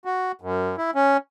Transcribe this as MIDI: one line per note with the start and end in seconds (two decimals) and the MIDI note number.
0.05 0.32 66
0.42 0.76 42
0.78 0.91 64
0.95 1.17 61